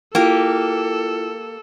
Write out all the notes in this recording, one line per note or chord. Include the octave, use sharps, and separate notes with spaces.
A#3 E4 F4 G4 A4